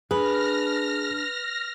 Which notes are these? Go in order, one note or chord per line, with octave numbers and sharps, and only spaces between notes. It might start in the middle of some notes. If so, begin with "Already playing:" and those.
D4 G#4 B4 F6 A#6